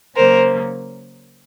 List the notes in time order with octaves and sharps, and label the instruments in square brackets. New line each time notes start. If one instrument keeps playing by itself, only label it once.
[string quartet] C#3 F#3 A#3 A#4 C5